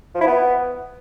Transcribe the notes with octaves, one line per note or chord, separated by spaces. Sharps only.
F3
E4
B3